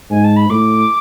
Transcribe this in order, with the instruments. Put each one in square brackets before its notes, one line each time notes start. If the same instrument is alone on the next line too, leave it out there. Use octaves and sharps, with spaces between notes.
[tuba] G#2 [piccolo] G#5
[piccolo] A5
B5
[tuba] A2 [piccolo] D6